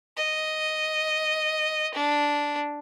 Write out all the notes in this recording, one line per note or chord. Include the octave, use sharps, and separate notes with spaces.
D#5
D4